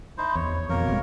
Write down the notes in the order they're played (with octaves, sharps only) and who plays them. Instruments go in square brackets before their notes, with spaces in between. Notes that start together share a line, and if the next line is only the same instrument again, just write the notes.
[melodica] D#4 E4 C5
[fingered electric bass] E2 [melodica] C#5
[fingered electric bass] F2 B2 [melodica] A#3 A#4 C#5
[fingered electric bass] G1 G#3